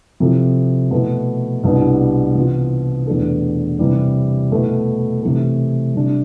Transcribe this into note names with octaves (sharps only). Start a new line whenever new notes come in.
C3 F3 C4 E4 A4
B2 A3 E4
C2 B2 G3 D4
C3 E3 B3 F4
E2 B2 A3 D4 A4
C3 E3 G3
B2 A3 E4
C3 E3 A3
C3 G3 D4